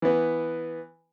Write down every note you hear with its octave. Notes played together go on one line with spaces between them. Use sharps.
E3 B3